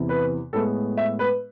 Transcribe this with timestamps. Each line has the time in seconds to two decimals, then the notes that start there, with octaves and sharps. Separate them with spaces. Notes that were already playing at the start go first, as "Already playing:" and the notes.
Already playing: E2 C3 E3
0.09 B4
0.53 A2 G#3 B3 A4
0.97 E5
1.19 B4